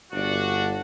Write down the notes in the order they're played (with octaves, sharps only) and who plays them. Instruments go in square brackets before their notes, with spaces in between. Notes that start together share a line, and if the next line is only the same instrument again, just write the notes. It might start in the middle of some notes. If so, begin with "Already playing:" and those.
[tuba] G1 [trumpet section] D4 F#4